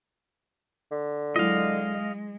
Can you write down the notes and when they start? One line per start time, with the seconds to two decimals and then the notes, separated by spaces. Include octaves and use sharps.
0.91 D3
1.36 F#3 G#3 E4 F4 D#5 F5